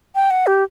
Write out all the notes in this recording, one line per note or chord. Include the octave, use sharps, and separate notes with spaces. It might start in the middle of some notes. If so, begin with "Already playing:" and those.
G5
F#5
G4